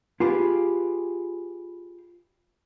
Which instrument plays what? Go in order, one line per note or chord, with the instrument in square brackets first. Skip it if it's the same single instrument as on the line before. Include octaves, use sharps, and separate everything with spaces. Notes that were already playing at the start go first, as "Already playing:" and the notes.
[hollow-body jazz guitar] F4 G4 G#4 B4